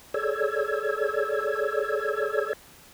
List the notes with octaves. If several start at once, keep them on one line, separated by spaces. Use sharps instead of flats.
G#4 A4 C#5 D5 E6 G#6